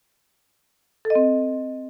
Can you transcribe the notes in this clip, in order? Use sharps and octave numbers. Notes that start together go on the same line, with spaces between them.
A4
D#5
C4